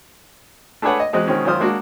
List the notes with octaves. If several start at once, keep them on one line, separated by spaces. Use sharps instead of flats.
A3 D4 G#4 B4 C#5 F#5
D#5
E2 G#3 C4 F#4 D#5 F#6
B2 D#3 G#3 C4 C#4
F#2 D#3 F4 C5 D#6 F6
G#3 A#3 D4 F#4